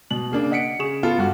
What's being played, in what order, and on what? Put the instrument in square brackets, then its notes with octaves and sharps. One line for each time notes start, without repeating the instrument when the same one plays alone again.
[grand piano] B2 F#7
C#3 A#3 D4
D#5 F#5 B6 C#7 D7
C#3 G#4 C#6 E7
B3 F4 A4
G2 F#4